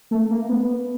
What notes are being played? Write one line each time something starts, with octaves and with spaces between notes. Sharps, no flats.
A3
A#3
B3